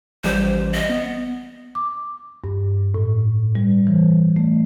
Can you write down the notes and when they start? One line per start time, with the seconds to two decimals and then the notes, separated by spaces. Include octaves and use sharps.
0.24 A1 F3 G3 C5
0.74 D#5
0.89 B3
1.75 D6
2.44 G2
2.94 A2
3.55 G3
3.87 E3
4.36 A3